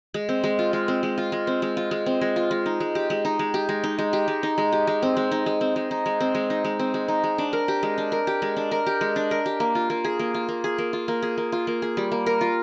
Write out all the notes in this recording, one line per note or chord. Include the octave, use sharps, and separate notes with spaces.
G#3
C4
G#3
F4
G#3
C4
G#3
F4
G#3
C4
G#3
F4
G#3
C4
G#3
F4
G#3
D#4
G#3
G4
G#3
D#4
G#3
G4
G#3
D#4
G#3
G4
G#3
D#4
G#3
G4
G#3
C4
G#3
D#4
G#3
C4
G#3
D#4
G#3
C4
G#3
D#4
G#3
C4
G#3
D#4
G#3
D4
A#4
G4
G#3
D4
A#4
G4
G#3
D4
A#4
G4
G#3
D4
A#4
G4
A#3
F4
A#3
G#4
A#3
F4
A#3
G#4
A#3
F4
A#3
G#4
A#3
F4
A#3
G#4
G3
A#3
A#4
F4